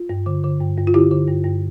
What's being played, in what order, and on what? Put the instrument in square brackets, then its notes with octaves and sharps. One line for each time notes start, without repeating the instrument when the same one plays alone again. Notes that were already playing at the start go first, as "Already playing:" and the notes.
Already playing: [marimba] F4
G2
D3
D3
G2
G2
F4
D3 E4 G4
D3
G2
G2